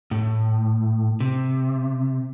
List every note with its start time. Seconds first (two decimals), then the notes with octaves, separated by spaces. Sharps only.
0.11 A2
1.20 C3